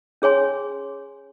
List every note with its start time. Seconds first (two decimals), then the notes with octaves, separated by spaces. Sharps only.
0.22 C#4 G#4 C#5 G#5 C6